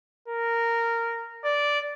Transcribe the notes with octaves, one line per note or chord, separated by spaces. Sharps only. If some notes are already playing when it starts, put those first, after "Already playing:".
A#4
D5